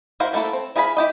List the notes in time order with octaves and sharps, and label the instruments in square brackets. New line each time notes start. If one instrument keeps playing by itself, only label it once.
[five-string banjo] E4 F#4 A#4 C5 F5
G3 A3 A#3 E4 A4
C4
E4 G#4 F5 A#5 B5
E4 G4 D#5